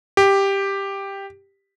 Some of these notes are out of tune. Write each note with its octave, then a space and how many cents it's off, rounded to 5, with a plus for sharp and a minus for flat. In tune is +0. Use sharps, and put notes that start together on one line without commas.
G4 +5